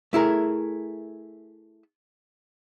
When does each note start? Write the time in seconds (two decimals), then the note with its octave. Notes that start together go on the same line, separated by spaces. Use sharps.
0.13 A3 E4 G#4 A#4